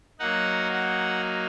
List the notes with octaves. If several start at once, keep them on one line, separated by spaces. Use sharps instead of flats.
F#3 A#3 D#4 F#5
F#5